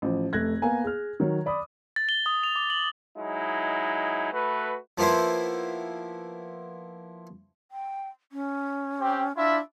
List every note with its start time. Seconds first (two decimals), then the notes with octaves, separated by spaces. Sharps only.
0.02 A1 F3
0.33 F1 A3 F#6 G#6 A#6
0.62 A#3 B3 F5 G#5 A#5
0.84 G#4 F6
1.20 D#3 F#3 C#5
1.46 D5 B5 D6 D#6
1.96 A6
2.09 G7
2.26 D#6
2.43 F7
2.56 D6
2.70 F#7
3.17 F#3 G#3 D#4 E4
4.32 A3 F#4 B4
4.98 F3 A#3 B3 E4 C5
7.71 G5
8.32 C#4
9.01 C4 G4
9.36 D4 E4 F4 E5